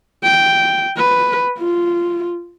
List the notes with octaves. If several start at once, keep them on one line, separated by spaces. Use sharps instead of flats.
G5
B4
F4